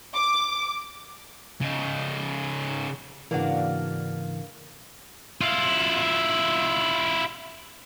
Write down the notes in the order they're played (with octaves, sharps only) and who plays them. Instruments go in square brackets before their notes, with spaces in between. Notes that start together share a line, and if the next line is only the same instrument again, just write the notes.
[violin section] D6
[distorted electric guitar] C#3 D#4
[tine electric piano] G#2 C#3 E3 [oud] A#3 D4 F#4
[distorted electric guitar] E4 F4